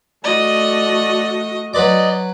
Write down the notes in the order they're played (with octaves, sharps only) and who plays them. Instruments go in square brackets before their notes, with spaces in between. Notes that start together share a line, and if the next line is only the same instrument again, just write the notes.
[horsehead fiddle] A3 F#4 [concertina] D5 [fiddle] D#5
[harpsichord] F#3 B4 D6 [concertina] D5 D#5